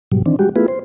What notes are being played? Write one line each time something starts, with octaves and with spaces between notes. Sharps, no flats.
G#2 B2 F#3 G3
D#3 E3 C4 D4
G3 G#3 F#4 G4
A3 B3 E4 F4 G#4 B4
C5